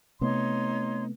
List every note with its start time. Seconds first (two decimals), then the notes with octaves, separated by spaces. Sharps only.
0.21 C3 A3 B3 D#4 C#5 C6